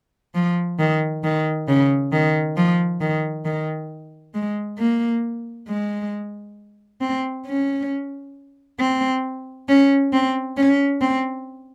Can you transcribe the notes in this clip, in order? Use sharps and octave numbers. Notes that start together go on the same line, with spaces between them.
F3
D#3
D#3
C#3
D#3
F3
D#3
D#3
G#3
A#3
G#3
C4
C#4
C4
C#4
C4
C#4
C4